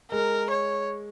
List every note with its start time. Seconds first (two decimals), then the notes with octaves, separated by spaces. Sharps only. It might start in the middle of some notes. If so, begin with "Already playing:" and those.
0.12 G#3 A#4
0.50 C#5